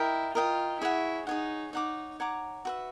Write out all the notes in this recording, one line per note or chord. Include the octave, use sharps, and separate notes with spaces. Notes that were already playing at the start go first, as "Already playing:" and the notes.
Already playing: E4 A#4 D#5 G5
F4 A#4 D#5 G5
E4 G#4 C#5 F#5
D#4 G#4 C#5 F#5
D#4 C#5 F#5 A#5 D6
C#5 F#5 A#5 D6
F#4 B4 E5